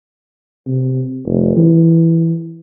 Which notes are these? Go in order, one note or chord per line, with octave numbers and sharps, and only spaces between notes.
C3
F1
E3